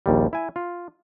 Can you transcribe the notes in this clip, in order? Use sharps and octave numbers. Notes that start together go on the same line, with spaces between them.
A#1 D#2 G3
E4 G#5
F4